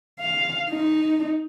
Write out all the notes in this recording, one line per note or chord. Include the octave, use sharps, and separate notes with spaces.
F5
D#4